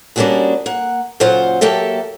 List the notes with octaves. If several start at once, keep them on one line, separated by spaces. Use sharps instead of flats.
G3 A#3 C#4 D4 F#4 G#4
A#3 F#5
A#2 C#3 F#3 F4 C5 F#5
F#3 A#3 G4 A4 E5